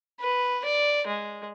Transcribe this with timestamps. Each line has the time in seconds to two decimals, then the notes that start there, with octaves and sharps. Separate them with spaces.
0.20 B4
0.65 D5
1.07 G#3